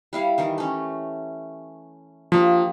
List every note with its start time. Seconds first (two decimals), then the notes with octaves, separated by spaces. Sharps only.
0.13 G3 E4 F5
0.38 D#3 E3 G4
0.58 A3 C#4
2.32 F3 A#3 D4 G4